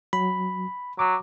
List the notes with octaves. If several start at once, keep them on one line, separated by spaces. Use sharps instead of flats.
F#3 B5
F#3 D6